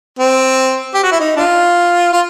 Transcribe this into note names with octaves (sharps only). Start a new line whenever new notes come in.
C4
G4
F#4
E4
D#4
D4 F4
F4